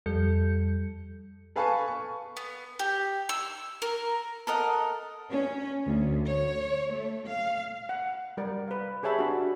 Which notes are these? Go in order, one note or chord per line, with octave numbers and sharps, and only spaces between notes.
F2 G3 A4 G6 C#7
A4 B4 F5 G#5 A5 C#6
C#6
B3
G4
E6
A#4
A4 A#4 D#5 F#5
C#4
D2
C#5
A3
F5
F#5
G3 A#4 D5
B4 F5
G4 G#4 C#5 E5 A5 B5
D4 F#4